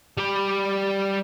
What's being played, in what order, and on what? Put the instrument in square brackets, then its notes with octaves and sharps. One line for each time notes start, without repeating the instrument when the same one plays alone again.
[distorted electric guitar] G3 B5